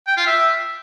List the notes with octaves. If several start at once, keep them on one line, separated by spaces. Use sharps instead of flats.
G5
F4
E5